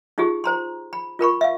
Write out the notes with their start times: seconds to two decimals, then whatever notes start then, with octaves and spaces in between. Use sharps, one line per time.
0.18 D#4 F4 G4 G#4
0.44 C5 A#5 C6
0.93 B5
1.19 F4 A#4 B5 C#6
1.41 E5 F5